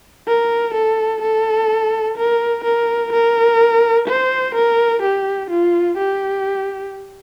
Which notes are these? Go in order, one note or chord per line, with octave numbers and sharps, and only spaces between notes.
A#4
A4
A4
A#4
A#4
A#4
C5
A#4
G4
F4
G4